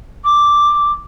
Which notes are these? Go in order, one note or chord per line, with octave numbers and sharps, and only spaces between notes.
D6